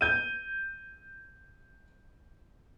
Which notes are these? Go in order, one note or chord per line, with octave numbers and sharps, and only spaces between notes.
G6 D#7